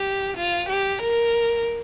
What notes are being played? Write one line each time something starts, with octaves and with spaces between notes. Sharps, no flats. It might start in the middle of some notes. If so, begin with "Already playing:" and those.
Already playing: G4
F4
G4
A#4